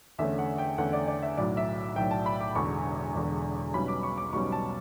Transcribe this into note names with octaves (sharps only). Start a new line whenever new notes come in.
E2 D3 A3 C#4 E5
F#5
G5
E2 D3 A3 C#4 F#5
D5
D5
E5
B1 A2 F#3 D5
E5
B1 A2 F#3 G5
A5
B5
D6
E1 E2 D3 C#6
E1 E2 D3
B1 B2 G3 C#4 B5
D6
C#6
D6
B1 B2 G3 C#4 C#6
A5